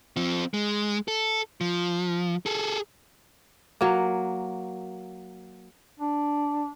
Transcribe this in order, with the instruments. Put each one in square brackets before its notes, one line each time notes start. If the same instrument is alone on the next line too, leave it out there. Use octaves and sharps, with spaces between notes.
[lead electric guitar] F3 C4
G#3
A4
F3
G#4 A4
[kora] F#3 A#3
[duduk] D4